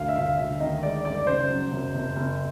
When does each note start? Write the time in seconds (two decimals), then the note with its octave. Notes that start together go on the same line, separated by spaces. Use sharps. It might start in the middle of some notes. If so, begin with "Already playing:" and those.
Already playing: D2 F5
0.08 E5
0.16 D2 F5
0.38 D2 E5
0.60 D#3 D#5
0.83 G#3 D5
1.05 F#2 D5
1.27 C#3 C5
1.50 F#3
1.72 F#1
1.95 F#1
2.16 F#1